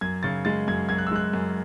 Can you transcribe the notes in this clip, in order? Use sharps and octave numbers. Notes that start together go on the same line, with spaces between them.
F#2 G#6
C#3 A6
G#3 A6
F#2 G#6
F#2 G#6
F#6
E6
G#3 F#6
F#2